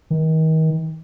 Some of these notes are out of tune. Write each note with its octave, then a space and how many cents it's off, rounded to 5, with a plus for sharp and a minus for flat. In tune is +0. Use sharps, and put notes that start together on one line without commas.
D#3 +35